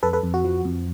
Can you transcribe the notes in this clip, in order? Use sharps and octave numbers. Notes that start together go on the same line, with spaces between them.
F2 A4 B4
A4 B4
F2
F#4
F3
F2